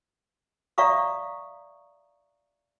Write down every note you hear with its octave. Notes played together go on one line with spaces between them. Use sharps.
D5 E5 F5 A#5 C#6 D#6